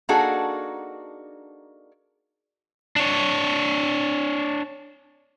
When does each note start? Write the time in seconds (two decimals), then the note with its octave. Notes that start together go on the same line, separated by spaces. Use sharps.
0.09 A#3 D4 D#4 F#4 G#4 A4
2.96 D4 C#5